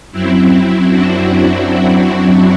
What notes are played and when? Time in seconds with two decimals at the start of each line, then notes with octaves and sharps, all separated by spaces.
0.12 F#2 F#3 C4 E4
0.90 D4 F#4
1.29 D4